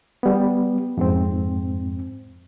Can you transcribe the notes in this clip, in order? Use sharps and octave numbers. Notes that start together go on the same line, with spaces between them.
G3 B3
F2 G#2 C4